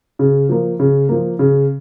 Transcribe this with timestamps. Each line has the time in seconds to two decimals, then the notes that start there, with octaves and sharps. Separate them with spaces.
0.19 C#3
0.49 F3 A#3
0.80 C#3
1.09 F3 A#3
1.39 C#3